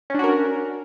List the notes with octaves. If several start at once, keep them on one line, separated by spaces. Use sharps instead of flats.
C#4 D4 F#4 A#4